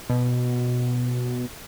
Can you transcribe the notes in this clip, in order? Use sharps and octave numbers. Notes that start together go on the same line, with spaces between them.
B2